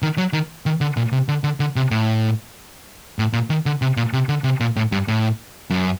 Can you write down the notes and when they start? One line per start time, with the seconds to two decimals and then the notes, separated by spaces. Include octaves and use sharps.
0.02 D#3
0.18 F#3
0.33 D#3
0.66 D#3
0.81 D3
0.97 A#2
1.12 C3
1.28 D3
1.44 D3
1.60 D3
1.76 C3
1.91 A2
3.19 A2
3.33 A#2
3.50 D#3
3.66 D3
3.82 C3
3.97 A#2
4.13 C3
4.29 D3
4.44 C3
4.60 A#2
4.76 A2
4.92 G2
5.08 A2
5.70 F#2